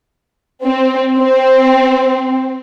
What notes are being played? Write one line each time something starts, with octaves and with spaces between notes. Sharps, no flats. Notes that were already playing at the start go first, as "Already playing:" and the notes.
C4
C4